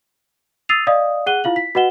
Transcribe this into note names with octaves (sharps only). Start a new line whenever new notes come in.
D#6 E6 A6 C7 D#7 F7
D5 D#5 F5 D#6
G#4 F#5 F#6 D#7 G7
E4 F4 F5 F#7
B6
F#4 B4 D#5 F#5 E7 G7